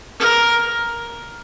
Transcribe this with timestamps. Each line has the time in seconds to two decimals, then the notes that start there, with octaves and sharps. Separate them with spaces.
0.19 A#4